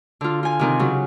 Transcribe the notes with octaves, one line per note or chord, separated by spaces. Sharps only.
D3 F4
F4 G#5
C3 D#3 C4
C#3 F#3